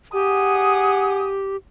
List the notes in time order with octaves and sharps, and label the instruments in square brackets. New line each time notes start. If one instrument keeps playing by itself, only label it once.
[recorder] G4 [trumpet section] G#4 F#5 [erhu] D#6